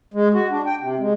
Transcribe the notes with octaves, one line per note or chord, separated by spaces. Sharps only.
G#3
F#4
D4
G5
C3
G#3